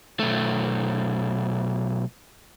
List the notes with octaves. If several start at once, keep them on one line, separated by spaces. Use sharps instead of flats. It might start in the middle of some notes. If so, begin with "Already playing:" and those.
B1 A3